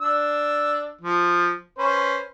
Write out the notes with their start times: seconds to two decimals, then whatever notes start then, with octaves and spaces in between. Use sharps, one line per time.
0.01 D4 E6
1.01 F3
1.78 C#4 B4 C5